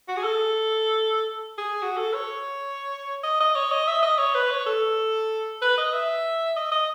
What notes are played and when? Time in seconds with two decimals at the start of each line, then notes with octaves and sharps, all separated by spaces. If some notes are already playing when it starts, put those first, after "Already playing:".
0.08 F#4
0.17 G#4
0.24 A4
1.58 G#4
1.82 F#4
1.97 A4
2.14 C#5
3.24 D#5
3.40 D#5
3.55 C#5
3.71 D#5
3.88 E5
4.03 D#5
4.18 C#5
4.35 B4
4.51 C#5
4.66 A4
5.62 B4
5.78 D#5
5.93 E5
6.57 D#5
6.72 D#5